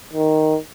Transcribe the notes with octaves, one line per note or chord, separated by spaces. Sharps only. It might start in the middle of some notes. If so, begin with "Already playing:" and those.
D#3